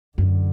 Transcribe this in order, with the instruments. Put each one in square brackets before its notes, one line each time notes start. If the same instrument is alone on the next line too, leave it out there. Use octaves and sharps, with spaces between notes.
[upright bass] F#2 [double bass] D3